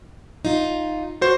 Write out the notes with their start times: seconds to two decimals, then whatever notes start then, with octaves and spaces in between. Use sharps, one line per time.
0.45 D#4 F4
1.21 F#4 C5